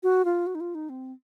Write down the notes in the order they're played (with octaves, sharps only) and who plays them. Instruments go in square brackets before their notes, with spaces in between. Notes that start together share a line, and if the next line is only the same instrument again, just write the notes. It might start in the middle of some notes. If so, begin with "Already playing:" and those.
[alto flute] F#4
F4
F#4
D#4
F4
D#4
C4